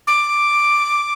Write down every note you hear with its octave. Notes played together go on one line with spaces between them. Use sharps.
D6